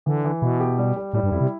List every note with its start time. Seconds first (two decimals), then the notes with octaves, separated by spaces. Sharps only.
0.06 D3 E3
0.25 E3
0.42 B2 E4
0.60 G4
0.78 G3
0.96 G3
1.14 A2 G3
1.24 G2
1.32 F2 E4
1.41 C3